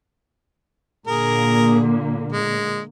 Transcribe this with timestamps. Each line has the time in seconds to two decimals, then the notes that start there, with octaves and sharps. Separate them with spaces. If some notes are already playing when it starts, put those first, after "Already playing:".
1.07 A#2 D3 A#3 G#4 A#4
2.32 G#3